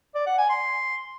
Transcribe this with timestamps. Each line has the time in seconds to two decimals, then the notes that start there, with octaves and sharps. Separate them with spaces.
0.15 D5
0.27 F#5
0.38 G#5
0.50 C6